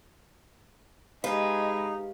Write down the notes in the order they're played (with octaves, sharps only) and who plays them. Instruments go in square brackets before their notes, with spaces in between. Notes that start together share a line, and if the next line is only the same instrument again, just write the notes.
[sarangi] G#3 [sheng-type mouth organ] D#4 [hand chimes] G4 F5 [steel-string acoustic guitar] B4